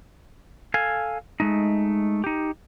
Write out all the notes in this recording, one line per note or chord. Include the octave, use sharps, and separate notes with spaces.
A4 F5 G#5
G#3 A3 D#4
D#4 G4